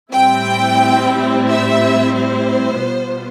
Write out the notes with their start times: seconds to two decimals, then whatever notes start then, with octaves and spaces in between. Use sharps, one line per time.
0.12 A2 G3 C4 E4 G5
1.48 E5
2.15 C5
2.83 B2 G3 B3 F4